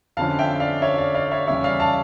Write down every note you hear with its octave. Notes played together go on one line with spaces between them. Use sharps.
F2 D3 F3 C#4 F5 A5
E5 G5
D5 F5
C#5 E5
D5 F5
D5 F5
C#5 E5
E2 C#3 G3 C#4 C#5 E5
D5 F5
F5 A5